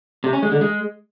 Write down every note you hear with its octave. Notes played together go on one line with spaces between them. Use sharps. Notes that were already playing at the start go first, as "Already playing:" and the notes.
C3
C#4
G#3
D3
G#3